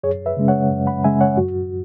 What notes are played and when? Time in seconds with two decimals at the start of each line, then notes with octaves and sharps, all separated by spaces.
0.03 F#2 G#4 C#5
0.26 B4 E5
0.37 C#3 G#3 C#4
0.48 C#5 F#5
0.70 F#2
0.87 F#5 B5
1.04 C#3 G#3 C#4 E5 G#5
1.21 C#5 F#5
1.37 F#2 F#4